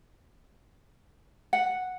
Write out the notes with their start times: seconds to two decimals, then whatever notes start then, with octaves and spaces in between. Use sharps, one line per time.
1.53 F#5